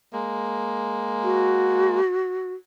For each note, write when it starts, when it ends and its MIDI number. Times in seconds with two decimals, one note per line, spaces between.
0.13 2.00 56
0.13 2.00 58
1.23 2.54 66